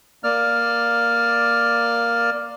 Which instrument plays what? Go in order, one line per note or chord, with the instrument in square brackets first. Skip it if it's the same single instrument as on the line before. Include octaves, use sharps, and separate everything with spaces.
[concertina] A#3 D5 F6